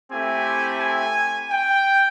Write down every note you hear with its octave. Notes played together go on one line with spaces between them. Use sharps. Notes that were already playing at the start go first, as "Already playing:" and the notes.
A3 C4 E4 G4 G#5
G#5
G5